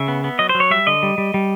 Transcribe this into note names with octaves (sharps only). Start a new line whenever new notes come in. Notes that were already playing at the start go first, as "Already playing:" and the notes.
Already playing: C#3 E5
B3
B3
F#3 D#5
C5
F#3
C#5
G3 E5
D3 D#5
G3
G3
G3